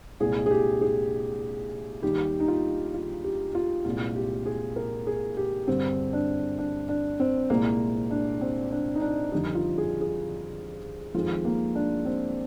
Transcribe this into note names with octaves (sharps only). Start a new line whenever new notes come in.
C2 A#2 G#3 G#4
G#4
G4
G#4
D#2 D#3 G3 G4
D#4
F4
F4
G4
F4
C2 A#2 G#3 F4
G4
G#4
A#4
G#4
G4
G2 D3 G3 C4
D4
D4
D4
C4
C2 A#2 G#3 A#3
D4
C4
D4
D#4
D4
F2 D3 G3 D#4
F4
G#4
G#4
F2 D#3 G#3 F4
A#3
D4
C4